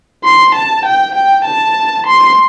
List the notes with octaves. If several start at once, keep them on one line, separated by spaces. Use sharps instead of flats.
C6
A5
G5
G5
A5
C6